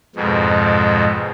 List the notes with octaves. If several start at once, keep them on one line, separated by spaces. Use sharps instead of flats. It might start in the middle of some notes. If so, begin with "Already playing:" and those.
F2 G#2 B2